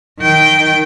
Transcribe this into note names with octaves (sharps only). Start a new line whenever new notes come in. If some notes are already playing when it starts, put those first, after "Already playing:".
D#3 G5